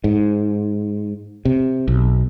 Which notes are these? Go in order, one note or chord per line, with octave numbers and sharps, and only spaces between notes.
G#2
C3
B1